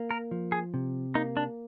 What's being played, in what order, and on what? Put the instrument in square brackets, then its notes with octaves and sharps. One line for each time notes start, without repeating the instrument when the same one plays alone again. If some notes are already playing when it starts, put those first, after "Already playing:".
Already playing: [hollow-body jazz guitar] A#3
[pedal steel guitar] A#4
[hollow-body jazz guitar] F3
[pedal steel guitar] G#4
[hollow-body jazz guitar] C3
[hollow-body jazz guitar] A#3 [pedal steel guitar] D#4
[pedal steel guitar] D4